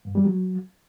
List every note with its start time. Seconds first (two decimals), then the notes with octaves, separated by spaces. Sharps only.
0.05 G2
0.15 G3
0.25 F#3